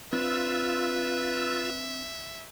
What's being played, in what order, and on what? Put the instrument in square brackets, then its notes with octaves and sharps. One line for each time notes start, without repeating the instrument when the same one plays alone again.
[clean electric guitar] C4 D4 [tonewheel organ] F4 E6 [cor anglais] B4 [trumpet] E5